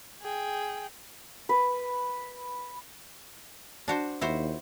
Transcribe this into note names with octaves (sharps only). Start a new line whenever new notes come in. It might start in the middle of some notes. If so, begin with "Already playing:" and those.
G#4 G5
B4
D4 F#4 C5
D#2 E4 F#4 C5